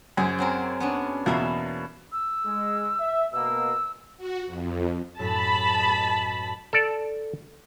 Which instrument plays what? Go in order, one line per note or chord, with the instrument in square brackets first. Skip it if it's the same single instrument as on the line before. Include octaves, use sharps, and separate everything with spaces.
[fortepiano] F#2 [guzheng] G#4 C5
[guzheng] F#3 C4 A#4
B3 C#4 D4
[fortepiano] E2 B2 [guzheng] A#3 E5 F5
[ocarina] E6
[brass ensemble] G#3
E5
[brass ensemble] B2 A#3 [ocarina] E6
[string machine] F#4
F2
[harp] F#2 A2 [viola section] A5 B5
[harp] B4 D#5
[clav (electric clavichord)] A4 D5